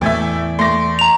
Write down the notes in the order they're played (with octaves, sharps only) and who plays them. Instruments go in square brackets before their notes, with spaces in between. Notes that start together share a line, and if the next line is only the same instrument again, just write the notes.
[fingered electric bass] E2 [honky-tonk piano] A2 A3 E5 [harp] D5 G#5
[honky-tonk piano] A3 A#6 [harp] C6 D6
[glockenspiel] A#5 F7